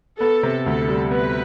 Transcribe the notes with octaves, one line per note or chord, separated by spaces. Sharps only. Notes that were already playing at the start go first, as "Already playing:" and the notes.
B3 A4
C3
D2 A4
G3
B3 B4